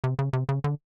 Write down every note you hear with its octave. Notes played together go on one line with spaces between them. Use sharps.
C3
C#3
C3
C#3
D3